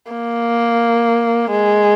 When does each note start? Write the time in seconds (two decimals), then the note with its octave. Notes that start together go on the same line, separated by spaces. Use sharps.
0.11 A#3
1.51 G#3